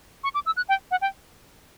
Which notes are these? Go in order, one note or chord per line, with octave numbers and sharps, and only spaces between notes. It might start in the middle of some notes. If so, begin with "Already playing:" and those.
C#6
D6
E6
F#6
G5
F#5
G5